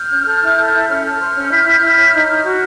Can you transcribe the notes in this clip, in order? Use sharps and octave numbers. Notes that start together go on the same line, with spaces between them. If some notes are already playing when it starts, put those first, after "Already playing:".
Already playing: F6 G6
C#4
A4
E4
A4
E4
C#4 F6 G6
A4
C5
C#4
E4
E4
E4
C#5
D#4
D#4
F#4